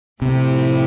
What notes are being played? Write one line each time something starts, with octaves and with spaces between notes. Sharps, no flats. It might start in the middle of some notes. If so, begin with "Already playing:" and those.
A2 C3 F3 A3 E4 G4